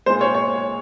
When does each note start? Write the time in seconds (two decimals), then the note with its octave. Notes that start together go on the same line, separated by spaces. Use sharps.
0.06 A#2 G#3 C5
0.21 C#5
0.35 C#5